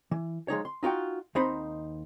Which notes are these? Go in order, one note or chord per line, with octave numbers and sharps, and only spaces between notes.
E3
F3 G#3 D#4 C#5
C6
D#4 F4 F#4 G5
D#2 C4 D#4 C5 B5